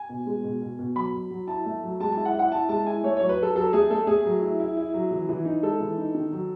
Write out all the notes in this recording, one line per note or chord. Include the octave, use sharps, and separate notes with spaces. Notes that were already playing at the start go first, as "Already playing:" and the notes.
Already playing: G#5
B2
G#3
B2
B2
B2
F#3 B5
F#3
F#3
E4 A5
A3
F#3
G#3 A5
E4 A5
F#5
E4
F#5
E4 A5
G#3 A5
E4 G#5
A3 C#5
F#3 C#5
B4
F#3 A4
F#3 A4
A3 G#4
A3 A4
A3 G#4
F#3
E4
E4
E4
F#3
E3
E3
D#4
G#3 A4
E3
D#4
D#3
F#3